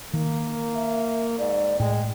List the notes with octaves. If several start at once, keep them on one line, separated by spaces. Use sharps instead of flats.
D#3 A#3
E5
G#2 D5
A2 G#3 G5